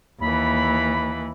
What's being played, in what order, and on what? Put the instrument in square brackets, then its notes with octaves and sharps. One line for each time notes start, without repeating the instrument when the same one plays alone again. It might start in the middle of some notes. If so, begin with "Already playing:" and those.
[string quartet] D#2 E3 [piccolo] B5